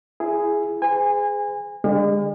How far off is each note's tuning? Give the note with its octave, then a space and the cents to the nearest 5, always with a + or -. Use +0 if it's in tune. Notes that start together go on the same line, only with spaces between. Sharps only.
E4 +25 G#4 +0
G#4 +0 C5 -40 G#5 -30
D3 +0 G#3 -40